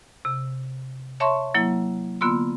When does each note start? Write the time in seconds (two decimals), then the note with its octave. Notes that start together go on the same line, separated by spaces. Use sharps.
0.25 C3
1.20 C#5 E5 A5 C6 C#6
1.54 F#3 A#3 E4
2.21 D3 A#3 B3 F4 C6 E6